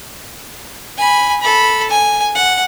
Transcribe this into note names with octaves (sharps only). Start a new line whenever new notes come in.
G#5 B5
A4 B5
G#5
F#5